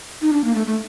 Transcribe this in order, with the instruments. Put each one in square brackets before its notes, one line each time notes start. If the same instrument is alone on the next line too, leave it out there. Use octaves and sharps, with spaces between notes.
[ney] D#4
D4
A#3
A3
A3